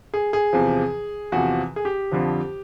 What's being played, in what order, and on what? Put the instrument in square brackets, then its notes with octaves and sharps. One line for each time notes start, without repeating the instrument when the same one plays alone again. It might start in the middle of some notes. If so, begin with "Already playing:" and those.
[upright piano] G#4
G#4
E2 C3 F3
E2 C3 F3 F#4
G#4
G4
F2 D3 F3